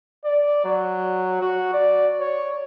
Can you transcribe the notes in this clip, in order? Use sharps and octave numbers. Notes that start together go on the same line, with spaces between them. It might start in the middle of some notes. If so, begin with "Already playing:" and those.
D5
F#3
F#4
D5
C#5